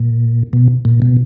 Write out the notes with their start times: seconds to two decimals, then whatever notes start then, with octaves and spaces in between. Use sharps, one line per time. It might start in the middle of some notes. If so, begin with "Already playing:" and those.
Already playing: A#2
0.53 B2
0.85 A#2
1.02 B2